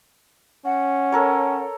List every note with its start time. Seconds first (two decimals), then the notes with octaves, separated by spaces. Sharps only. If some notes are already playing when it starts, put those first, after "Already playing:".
0.65 C#4 F#5
1.12 A4 A#4 C#5